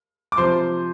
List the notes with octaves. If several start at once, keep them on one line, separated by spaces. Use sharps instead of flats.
D6
C3 F3 C5 C6